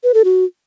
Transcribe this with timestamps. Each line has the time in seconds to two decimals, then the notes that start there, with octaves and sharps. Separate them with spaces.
0.04 B4
0.14 A4
0.24 F#4